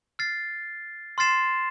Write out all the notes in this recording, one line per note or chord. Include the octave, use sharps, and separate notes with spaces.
F6 A6 C7
C6 F6 A6 C7 E7